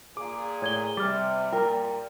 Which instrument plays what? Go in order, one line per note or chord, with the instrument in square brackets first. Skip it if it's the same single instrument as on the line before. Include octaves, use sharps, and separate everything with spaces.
[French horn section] A#2 G#4 [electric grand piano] D6
[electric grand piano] A2 [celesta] C#5 G#6 G7
[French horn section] C3 [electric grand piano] G3 A6 [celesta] D6 F6
[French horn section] A#2 [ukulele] A#4 [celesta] G5